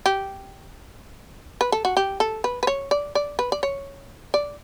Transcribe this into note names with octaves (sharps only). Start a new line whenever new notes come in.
G4
B4
A4
F#4
G4
A4
B4
B4
C#5
D5
D5
B4
D5
C#5
D5